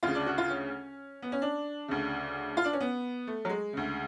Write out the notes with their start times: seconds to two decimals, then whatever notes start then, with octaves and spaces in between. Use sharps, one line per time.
0.03 D2 C#3 F4
0.15 D4
0.26 F#4
0.38 F4
0.49 C#4
1.22 B3
1.32 C#4
1.42 D4
1.88 D2 C#3
2.57 F4
2.64 D4
2.73 C#4
2.80 B3
3.27 A3
3.45 F#3
3.49 G#3
3.73 D2 C#3